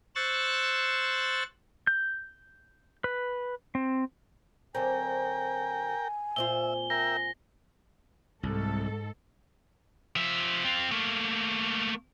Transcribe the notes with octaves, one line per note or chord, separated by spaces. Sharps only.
C5 C#6 E6 F#6 A6
G6
B4
C4
D3 F#3 C4 A#4 G5 G#5
A#2 C4 F4 E5 G7
A#4 E5 G5 A#6
C2 G#2 A4
F3 E5
C4 F4
A3 A#3